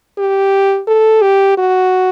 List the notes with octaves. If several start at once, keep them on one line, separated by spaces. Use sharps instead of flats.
G4
A4
G4
F#4